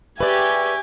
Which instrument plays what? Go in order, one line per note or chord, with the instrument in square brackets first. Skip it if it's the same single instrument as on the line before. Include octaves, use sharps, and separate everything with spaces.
[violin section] G4 [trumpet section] G#4 E5 C#6 [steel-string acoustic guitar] B4 D5 [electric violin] G#5